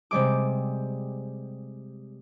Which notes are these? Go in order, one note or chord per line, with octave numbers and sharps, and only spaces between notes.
C3 G3 G#3 D6